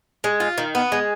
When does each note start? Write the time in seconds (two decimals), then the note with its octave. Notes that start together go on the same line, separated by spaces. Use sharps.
0.24 G#3
0.40 F4
0.58 D#3
0.75 B3
0.92 G#3